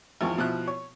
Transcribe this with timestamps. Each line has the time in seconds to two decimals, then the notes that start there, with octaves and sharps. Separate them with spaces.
0.21 G#1 E2 F3 C#6
0.38 B2 F3 E4 F#6
0.67 C#5